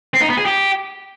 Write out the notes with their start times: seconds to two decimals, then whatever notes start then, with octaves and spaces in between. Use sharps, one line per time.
0.14 C4
0.22 D#4
0.30 B3
0.38 G#4
0.46 G4